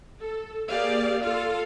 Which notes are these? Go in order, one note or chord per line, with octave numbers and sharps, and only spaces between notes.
A4
A#3 G4 G#4 D5 F5
F4 A4 F5